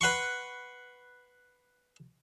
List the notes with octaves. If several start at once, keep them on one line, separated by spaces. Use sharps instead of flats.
B4 F#5 C6 C#6